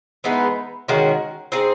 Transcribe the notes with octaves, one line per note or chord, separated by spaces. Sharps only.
E3 G#3 B3 D#4
D#3 G#3 C#4 F#4
C4 D#4 G#4